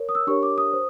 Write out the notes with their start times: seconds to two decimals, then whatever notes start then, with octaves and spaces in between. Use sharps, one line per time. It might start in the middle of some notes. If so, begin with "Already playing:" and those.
Already playing: A#4 C#5
0.09 D#6
0.15 E6
0.27 D4 G4 A#4 C#5 C#6
0.43 D6
0.58 D#6
0.73 C5